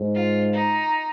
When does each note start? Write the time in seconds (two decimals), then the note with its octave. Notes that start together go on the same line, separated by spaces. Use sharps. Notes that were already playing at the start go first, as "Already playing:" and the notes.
Already playing: G#2
0.15 F4
0.54 D#4